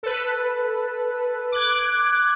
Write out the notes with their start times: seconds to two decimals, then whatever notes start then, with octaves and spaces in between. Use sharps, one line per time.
0.03 A4 B4
1.52 D6 F#6 G#6